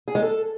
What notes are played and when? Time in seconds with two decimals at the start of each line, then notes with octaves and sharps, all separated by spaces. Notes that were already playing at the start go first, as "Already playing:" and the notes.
0.08 G#4
0.15 G#3
0.22 A4